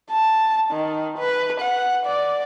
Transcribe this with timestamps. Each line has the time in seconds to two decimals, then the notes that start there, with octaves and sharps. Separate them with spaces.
0.10 A5
0.72 D#3
1.19 B4
1.61 F#5
2.06 D5